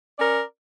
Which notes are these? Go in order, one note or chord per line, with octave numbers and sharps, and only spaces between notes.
C#4 A#4 D5